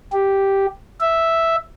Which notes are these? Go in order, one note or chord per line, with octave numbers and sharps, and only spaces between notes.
G4
E5